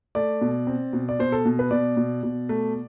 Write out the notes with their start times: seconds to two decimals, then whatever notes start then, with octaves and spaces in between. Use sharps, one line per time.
0.15 A3 D5
0.41 B2
0.67 C4
0.93 B2
1.09 D5
1.19 B2 C5
1.32 A4
1.45 B2
1.59 B4
1.71 B2 D5
1.97 B2
2.23 B2
2.49 A3